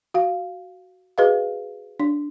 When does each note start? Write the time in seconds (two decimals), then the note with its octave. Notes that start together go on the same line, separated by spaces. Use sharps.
0.14 F#4 F5
1.18 F#4 G#4 B4 D#5 F5
2.00 D4